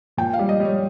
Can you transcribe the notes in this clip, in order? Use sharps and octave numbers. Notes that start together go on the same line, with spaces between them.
A#2 G5
F5
G3
D#5
G3 C#5